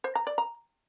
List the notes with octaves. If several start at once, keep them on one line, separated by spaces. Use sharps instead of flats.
C5
A#5
D5
A#5